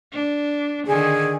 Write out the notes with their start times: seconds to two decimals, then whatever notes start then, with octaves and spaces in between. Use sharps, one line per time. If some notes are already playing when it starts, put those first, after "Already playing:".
0.12 D4
0.87 D3 D#3 G#4